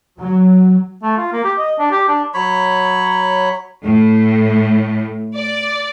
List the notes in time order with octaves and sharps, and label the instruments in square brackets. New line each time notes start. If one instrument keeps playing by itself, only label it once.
[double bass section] F#3
[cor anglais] A3
F4
A#3
G4
D#5
D4
G4
D4
[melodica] F#3 C#5 B5
[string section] A2
D5